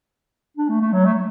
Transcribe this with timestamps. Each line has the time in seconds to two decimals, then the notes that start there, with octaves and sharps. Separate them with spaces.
0.57 D4
0.69 A3
0.81 A3
0.93 F#3
1.05 A3